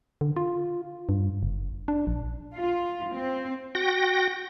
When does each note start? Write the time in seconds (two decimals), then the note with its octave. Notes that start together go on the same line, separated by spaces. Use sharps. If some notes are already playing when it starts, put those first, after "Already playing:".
0.21 D3
0.36 F4
1.09 G2
1.43 F#1
1.88 D4
2.07 A#1
2.56 F4
3.14 C4
3.75 F#4 G5 A#6